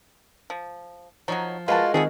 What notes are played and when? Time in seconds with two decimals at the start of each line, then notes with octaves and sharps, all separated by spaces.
0.50 F3
1.28 F3 F#3 D#4 C#5 A#5 C#7
1.68 G#3 F4 F#4 A#4 B4 A5
1.94 D#3 F3 A3 B3 C4 F4 G#4